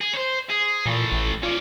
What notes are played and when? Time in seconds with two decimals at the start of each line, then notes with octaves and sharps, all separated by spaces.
0.01 G#4
0.14 C5 C#5
0.50 G#4
0.86 A#2 E3 A3
1.12 A1
1.43 C#4 F4 D5